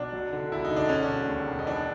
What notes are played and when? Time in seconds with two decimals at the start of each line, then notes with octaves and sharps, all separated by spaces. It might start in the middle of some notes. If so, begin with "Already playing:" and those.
Already playing: B1 D4
0.13 F#3
0.32 D3
0.52 E1 E4
0.65 D#4
0.71 D3
0.76 D4
0.89 E1 C#4
1.02 D4
1.09 E1
1.28 D#2
1.48 E1
1.59 D#4
1.66 E3 D4